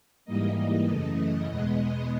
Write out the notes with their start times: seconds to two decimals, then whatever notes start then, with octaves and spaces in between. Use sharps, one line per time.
0.25 G#2 E3 G3 A#3 D#5
0.85 F#2 C#3 E3 A3
1.46 E2 B2 G#3 B3